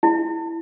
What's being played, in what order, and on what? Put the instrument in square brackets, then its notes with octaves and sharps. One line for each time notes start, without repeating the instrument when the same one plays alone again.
[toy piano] E4